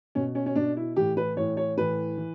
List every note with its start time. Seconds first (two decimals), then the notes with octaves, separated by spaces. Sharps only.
0.15 B2 C#4
0.35 C#4
0.46 C#4
0.56 B2 D4
0.77 E4
0.96 A2 E3 G4
1.17 B4
1.37 A2 E3 C#5
1.57 C#5
1.78 A2 E3 B4
2.18 E3